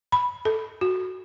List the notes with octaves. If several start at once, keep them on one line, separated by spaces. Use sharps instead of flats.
B5
A4
F#4